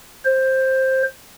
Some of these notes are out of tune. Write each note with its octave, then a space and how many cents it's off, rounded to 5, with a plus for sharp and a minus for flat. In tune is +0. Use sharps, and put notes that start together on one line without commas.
C5 +10